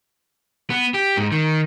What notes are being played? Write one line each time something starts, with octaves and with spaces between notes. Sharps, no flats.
B3
G4
G#2
D#3